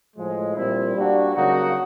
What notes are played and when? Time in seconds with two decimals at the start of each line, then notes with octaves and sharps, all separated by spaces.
0.16 A2 F3 G#3
0.56 A#2 G3 C4 E4
0.95 G3 A#3 D4 F#4
1.35 C#3 F#3 A#3 D#4 F#4